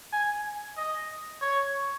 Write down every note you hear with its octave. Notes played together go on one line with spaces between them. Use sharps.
G#5
D#5
C#5